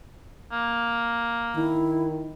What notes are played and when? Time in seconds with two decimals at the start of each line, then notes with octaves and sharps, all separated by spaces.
0.52 A#3
1.56 D#3 E4